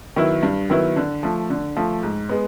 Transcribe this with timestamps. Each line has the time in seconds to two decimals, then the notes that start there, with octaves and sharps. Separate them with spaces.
0.16 D#3 F#3 B3 E4
0.43 G2
0.70 D#3 F#3 B3 E4
0.96 D3
1.23 F3 A3
1.50 D3
1.76 F3 A3
2.03 G#2
2.29 G#3 B3